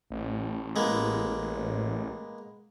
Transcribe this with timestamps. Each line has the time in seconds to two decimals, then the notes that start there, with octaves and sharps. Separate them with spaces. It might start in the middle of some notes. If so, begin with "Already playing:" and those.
0.10 A1
0.76 G#3 A#3 B3